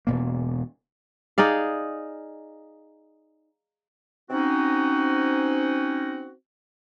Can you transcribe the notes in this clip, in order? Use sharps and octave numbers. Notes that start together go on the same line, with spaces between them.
E1 B2 A#3
D#4 G#4 D5 F5
C4 C#4 D#4 F#4